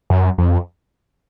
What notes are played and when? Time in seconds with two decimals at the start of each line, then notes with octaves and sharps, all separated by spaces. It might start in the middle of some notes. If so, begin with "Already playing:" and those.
0.10 F#2
0.38 F2